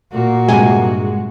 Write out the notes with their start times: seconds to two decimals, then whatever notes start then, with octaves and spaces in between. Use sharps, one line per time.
0.12 A#2 A#3 F#4
0.48 G2 C3 G#3 G#5